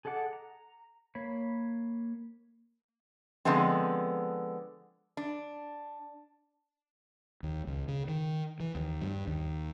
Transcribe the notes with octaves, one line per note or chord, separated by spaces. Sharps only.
G#4 A4 D#5 F#5 D6
A#5
A#3 C#5 B5
D3 F3 G#3 B3 C4
D4
D#2
C#2
C#3
D#3
E3
D#2
G2
D#2